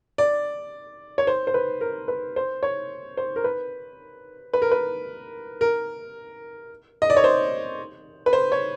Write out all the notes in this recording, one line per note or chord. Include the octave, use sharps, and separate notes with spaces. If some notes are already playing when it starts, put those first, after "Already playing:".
D5
C#5
C5
C5
B4
A#4
B4
C5
C#5
C5
A#4
B4
B4
A#4
B4
A#4
D#5
D5
C#5
C5
B4
C5
C#5